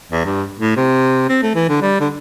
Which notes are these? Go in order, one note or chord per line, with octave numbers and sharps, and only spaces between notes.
E2
G2
A2
C3
C4
A3
E3
D3
G3
D3